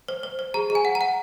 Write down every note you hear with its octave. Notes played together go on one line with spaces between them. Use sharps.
C5
C5
C5
G#4 A#5
G#4
G#5
F#5
A#5
F#5